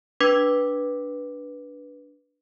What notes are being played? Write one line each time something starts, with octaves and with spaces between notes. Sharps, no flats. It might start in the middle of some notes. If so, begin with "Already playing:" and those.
D4 B4 D6 G#6 B6